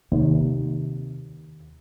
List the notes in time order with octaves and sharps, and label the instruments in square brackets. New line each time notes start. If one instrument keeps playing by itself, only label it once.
[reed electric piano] D#2 [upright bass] C3